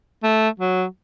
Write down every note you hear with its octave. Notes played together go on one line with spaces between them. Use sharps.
A3
F#3